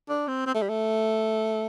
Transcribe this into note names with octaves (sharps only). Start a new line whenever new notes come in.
D4
C4
C4
A3
G3
A3